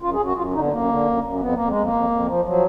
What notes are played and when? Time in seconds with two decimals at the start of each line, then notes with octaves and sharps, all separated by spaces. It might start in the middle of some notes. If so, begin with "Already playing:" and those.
0.02 F#2 F4
0.13 G#4
0.19 F#2
0.25 F#4
0.36 F#2 F4
0.54 D3 D#4
0.63 B3
0.71 F#2 A#3
0.89 D3
1.06 F#2
1.23 F#2
1.40 F2 B3
1.54 F2 A#3
1.69 G#3
1.75 F2
1.83 A#3
1.93 F2
2.10 F2
2.28 F3
2.45 F3 F#3